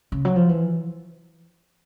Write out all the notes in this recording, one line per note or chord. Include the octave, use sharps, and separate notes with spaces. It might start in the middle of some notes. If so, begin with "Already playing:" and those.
C#3
F#3
F3
E3